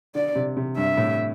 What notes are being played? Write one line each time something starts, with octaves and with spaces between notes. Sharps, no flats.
D3 D5
C3
C3
G2 E5
A2